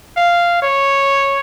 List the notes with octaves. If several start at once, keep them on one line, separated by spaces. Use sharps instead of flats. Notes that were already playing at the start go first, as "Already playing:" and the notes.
F5
C#5